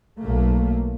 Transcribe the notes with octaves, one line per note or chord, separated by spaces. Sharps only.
B1 A3 A#3